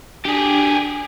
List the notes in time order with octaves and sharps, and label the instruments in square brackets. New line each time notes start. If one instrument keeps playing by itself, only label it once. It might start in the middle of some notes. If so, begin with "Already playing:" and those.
[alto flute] D4 [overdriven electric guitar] G4 G#4